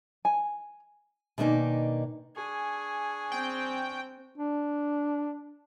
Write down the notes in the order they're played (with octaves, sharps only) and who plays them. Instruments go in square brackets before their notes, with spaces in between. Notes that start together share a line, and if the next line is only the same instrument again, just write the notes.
[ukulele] G#5
[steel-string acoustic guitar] B2 D#3 A#3 D4 D#4 G#5
[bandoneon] D4 G#5 C#6 [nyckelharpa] G#4
[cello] C4 [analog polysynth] G5
[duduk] D4